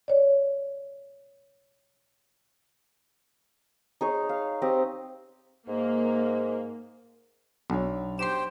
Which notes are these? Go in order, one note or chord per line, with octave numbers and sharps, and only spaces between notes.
C#5 D5
D#4 G#4 C#5
F5
C4 G4 D#5 F5
G#2 A#3
B1 D4 C#5
G4 C5 G5 C6 E7